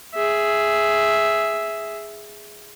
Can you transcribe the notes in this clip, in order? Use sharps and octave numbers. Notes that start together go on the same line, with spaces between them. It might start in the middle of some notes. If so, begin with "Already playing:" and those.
G#4 E5